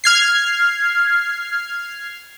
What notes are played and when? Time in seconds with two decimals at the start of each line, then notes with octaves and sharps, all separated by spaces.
0.04 F6 G#6 C7